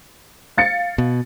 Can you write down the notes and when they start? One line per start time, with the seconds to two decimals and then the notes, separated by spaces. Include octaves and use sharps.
0.57 F5 A6 C#7
0.98 B2